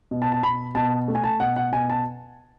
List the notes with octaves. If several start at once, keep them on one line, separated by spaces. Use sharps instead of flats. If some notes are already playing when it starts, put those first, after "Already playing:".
B2
A5
A5
B2 B5
B2 A5
A3
G#5
A5
B2 F#5
F#5
B2 G#5
A5